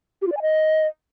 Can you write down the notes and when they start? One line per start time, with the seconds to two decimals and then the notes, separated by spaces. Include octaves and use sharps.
0.22 G4
0.27 F4
0.32 D5
0.37 G#5
0.42 D#5